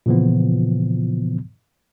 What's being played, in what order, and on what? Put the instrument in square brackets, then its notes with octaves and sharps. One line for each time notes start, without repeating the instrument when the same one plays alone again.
[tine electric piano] A#2 C#3 E3 F3 B3